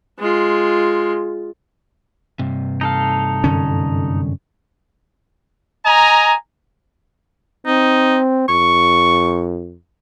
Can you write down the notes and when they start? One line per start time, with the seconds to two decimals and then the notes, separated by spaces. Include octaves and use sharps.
0.19 G#3 F4
2.39 G2 C3
2.81 D#4 A4 F5
3.44 F#2 D3 C#4
5.85 D#5 G#5 A#5
7.67 C4 D#4
8.49 F2 C#6